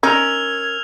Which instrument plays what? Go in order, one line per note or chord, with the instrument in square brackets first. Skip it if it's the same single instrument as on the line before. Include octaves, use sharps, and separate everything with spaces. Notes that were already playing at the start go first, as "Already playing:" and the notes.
[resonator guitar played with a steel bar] C#4 A#4 [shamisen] D#4 [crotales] E6 F6 F7 [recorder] G#6